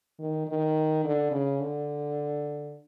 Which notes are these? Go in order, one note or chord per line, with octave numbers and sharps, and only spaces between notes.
D#3
D#3
D3
C#3
D3